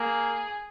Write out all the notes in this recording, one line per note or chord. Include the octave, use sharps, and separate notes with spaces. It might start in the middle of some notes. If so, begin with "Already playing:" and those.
Already playing: A#3 G#4